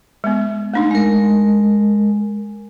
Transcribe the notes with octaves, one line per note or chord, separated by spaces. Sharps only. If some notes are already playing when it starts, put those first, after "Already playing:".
G#3 B3
A3 D4 D#4
G#3 A#4